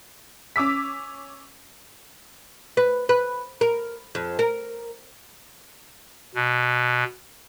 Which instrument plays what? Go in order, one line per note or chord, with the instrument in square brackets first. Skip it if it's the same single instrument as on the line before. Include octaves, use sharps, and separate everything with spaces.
[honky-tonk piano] C#4 D6 E6 B6
[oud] B4
B4
A#4
F2
A#4
[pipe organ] B2